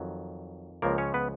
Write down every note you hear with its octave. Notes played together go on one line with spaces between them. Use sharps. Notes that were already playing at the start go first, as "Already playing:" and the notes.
Already playing: F2 D#3 F#3
C#2 C#3 F3 A#3 A#4
C#4 C#5
B3 B4